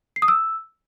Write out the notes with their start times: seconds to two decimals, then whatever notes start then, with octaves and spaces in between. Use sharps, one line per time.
0.16 C7
0.22 D#6
0.28 E6